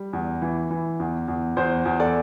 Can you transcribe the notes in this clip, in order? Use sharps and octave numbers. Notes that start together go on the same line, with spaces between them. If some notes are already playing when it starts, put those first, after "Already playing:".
Already playing: G3
E2
E3
E3
E2
E2
E2 C5
E2
A4 D5